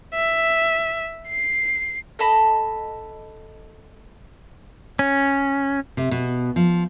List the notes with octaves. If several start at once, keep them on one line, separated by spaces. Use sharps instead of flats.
E5
C7
A4 D#5 A5 B5
C#4
C3
B2
F3